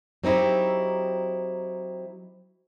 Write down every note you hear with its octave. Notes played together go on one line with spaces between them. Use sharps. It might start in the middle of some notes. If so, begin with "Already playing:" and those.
F#3 C4 D#4 E4 G4